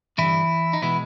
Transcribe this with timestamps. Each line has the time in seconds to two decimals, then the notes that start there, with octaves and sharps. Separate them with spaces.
0.18 G2 D3 E3 G3 E4
0.73 D#4
0.82 B2 E3 G#3 B3 E4